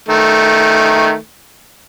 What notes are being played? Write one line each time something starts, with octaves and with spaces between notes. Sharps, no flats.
D#3 A3